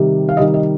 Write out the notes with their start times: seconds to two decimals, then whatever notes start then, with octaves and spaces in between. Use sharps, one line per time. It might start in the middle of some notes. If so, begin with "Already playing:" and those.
Already playing: C3 D#3 G3
0.29 F5
0.37 C3 D#3 G3 D#5
0.54 D#5